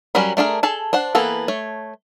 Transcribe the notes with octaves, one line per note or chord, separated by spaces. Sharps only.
F#3 G3 C#4 A#4 B5
A3 D4 G#4 A#4
G#4 A4 A5
D4 C5 F#5
E3 A#3 B3 A4
A3 C#5